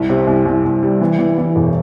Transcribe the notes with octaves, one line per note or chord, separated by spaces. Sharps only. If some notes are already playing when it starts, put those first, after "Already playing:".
Already playing: C2
C3
C2
C2
C2
G3
E3
E3
E3
E1